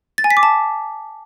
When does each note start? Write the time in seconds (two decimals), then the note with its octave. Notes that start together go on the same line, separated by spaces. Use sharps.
0.18 A6
0.24 G#5
0.30 B6
0.37 D6
0.43 A5